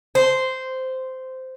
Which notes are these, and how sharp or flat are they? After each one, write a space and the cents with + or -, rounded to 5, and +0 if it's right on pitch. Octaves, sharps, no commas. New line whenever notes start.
C5 -10